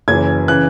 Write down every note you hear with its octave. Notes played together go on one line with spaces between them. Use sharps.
F#1 F#2 E3 G#6
C#3 E3 F#6